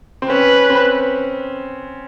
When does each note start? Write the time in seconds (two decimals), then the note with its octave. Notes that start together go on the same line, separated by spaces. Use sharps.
0.22 C4
0.30 C#4 B4
0.70 C4